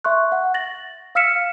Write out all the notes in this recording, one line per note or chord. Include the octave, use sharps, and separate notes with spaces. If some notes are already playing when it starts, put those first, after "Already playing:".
E5 C6 C#6 F#6
F#5
A6 A#6 F#7
F5 E6 F6 B6 C#7 E7